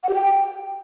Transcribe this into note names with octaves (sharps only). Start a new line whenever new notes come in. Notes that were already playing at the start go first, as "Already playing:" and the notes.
F#5
G4
G5